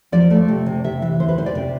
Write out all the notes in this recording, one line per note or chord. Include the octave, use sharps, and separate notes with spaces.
F3 D5
A3
C3
C3 D5
C3 E5
E3 E5
D2 C5
B4
D2 C5
D5
C3